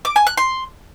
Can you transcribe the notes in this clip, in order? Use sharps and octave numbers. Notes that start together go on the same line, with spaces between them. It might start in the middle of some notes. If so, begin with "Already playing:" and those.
D6
G#5
F#6
C6